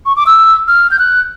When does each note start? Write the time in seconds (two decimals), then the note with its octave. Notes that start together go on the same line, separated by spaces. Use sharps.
0.06 C#6
0.16 D6
0.26 E6
0.68 F6
0.91 G6
0.99 F#6